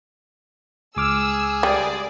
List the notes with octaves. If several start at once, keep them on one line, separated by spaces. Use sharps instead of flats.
C#2 G#4 D6 E6 F6
G3 D5